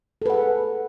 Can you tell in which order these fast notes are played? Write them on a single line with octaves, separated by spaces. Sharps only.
A4 B4 F#5 G#4